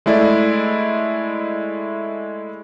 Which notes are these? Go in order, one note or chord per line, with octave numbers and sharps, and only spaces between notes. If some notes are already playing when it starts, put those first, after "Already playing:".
G#3 A3 E4 D5